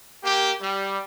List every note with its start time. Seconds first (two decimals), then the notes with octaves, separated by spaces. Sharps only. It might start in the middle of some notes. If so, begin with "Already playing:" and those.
0.23 A#3 G4
0.60 G3